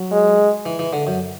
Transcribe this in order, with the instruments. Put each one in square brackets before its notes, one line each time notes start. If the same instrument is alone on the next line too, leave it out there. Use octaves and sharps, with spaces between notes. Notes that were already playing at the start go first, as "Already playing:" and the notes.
Already playing: [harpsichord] F#3
[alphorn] G#3
[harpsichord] E3
E3
D3
F#2